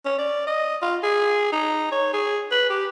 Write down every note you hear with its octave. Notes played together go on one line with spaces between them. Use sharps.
C#4
D5
D#5
F4
G#4
D#4
C#5
G#4
B4
G4